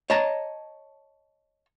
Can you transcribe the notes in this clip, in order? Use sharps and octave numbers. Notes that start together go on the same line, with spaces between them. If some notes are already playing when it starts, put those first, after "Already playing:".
C#5 D#5 A5 A#5